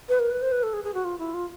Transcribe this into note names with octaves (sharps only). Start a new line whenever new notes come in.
B4
A#4
B4
C5
B4
A4
G#4
G#4
F#4
F4
E4
F4